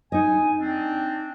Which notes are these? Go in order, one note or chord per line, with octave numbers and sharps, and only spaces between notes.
D#4 D#5 G#5
C4 D4